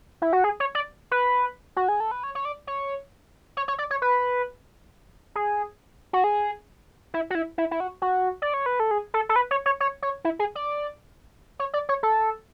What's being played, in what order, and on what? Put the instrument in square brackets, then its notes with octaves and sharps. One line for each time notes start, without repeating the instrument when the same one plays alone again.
[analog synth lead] E4
F#4
G#4
C#5
D5
B4
F#4
G#4
A4
B4
C#5
C#5
D5
C#5
C#5
C#5
D5
C#5
B4
G#4
F#4
G#4
E4
F#4
E4
E4
E4
F#4
F#4
D5
C#5
B4
A4
G#4
A4
A4
B4
C#5
C#5
C#5
C#5
E4
G#4
D5
C#5
D5
C#5
A4